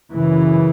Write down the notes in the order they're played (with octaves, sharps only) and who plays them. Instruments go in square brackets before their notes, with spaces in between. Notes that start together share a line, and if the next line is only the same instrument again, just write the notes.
[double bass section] F#2 C#3 E3